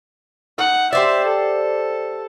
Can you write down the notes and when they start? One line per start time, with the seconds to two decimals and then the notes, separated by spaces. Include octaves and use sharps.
0.58 D#4 F#5
0.93 G4 C5 D5 E5
1.26 A4